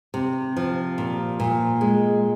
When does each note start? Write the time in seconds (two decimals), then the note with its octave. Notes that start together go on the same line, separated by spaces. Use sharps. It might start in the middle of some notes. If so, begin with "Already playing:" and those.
0.14 C3
0.56 F3
0.98 A#2
1.40 A#2
1.81 G#3